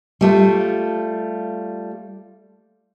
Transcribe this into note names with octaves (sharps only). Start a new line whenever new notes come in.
G3 A3 F4